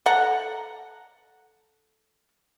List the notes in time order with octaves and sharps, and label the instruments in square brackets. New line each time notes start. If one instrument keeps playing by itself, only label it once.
[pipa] A4 F#5 A#5